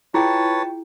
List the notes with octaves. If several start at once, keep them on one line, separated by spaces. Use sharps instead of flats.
E4 F4 G#4 B4 C#5 G5 A5